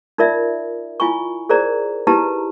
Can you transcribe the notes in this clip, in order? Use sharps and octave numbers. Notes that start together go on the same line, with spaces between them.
D#4 F4 A#4 D5 E5
E4 F4 G#5 B5 C#6
G#4 A#4 C5 D5 A#5
D#4 E4 G4 B4 A5 A#5